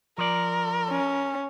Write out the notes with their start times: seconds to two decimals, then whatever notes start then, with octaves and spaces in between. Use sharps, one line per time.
0.18 F3 A#4 D5
0.90 C#4